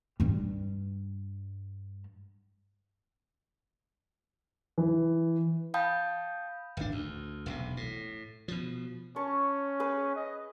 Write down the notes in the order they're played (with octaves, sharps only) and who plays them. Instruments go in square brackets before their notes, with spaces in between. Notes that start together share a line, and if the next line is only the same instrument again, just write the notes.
[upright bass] G2 G3
[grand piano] E3
[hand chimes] F5 G5 A5 B5 D#6 G6
[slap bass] D1 G#1 D4
D2
E1 B1 C3
A2
B2 F3
[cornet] C#4 [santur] A5 C#6
[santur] G#4 B4
[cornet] D#5